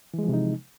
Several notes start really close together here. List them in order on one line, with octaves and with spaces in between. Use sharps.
E3 G#3 F3 C3 D#4